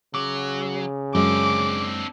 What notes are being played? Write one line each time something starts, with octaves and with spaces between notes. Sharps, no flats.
C#3 F#3 D6
F#2 G#3 C4 D4 D6